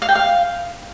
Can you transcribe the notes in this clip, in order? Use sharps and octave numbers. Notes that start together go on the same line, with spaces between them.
F5
G5
F5